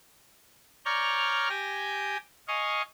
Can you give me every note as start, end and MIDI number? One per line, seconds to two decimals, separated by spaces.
0.85 1.49 73
0.85 1.49 74
0.85 1.49 82
0.85 1.49 85
0.85 1.49 89
0.85 1.49 91
1.49 2.17 67
1.49 2.17 79
1.49 2.17 80
1.49 2.17 91
1.49 2.17 94
2.48 2.82 75
2.48 2.82 77
2.48 2.82 80
2.48 2.82 85